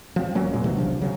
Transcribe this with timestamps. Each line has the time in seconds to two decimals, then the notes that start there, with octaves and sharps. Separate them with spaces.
0.16 F3 C4
0.35 E1 F#3 A#3 C#4
0.52 A#2 G#3
0.64 D#1 C3 E3 F#3
0.77 B1 C3 F3 D4
1.01 C#3 F#3